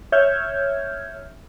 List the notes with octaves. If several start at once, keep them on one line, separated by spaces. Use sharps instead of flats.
C#5 E5 F6 G6 G#6